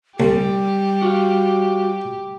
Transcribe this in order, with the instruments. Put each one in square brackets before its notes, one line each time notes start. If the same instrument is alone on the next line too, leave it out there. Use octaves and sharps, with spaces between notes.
[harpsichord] C2 [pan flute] G3 [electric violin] G4
[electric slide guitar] F#4 F5